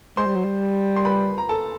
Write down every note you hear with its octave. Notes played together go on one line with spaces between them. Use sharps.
G#3 C5 C6
G3
F#3
G3
C6
B4 B5
A#5
A4 A5